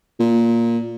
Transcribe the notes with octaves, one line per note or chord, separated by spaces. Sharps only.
A#2